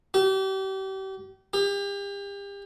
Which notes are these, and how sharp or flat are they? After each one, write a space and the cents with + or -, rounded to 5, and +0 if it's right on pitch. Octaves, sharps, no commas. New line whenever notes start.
G4 -35
G4 +35